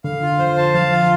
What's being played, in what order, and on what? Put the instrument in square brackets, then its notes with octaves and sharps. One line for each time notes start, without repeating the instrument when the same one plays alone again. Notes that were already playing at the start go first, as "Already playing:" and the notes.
[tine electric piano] D3 [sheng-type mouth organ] F5
[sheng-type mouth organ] F4
[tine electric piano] F3 [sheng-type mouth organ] C5
[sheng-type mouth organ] A5
[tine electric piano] F3 [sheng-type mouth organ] F5
[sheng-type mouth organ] F4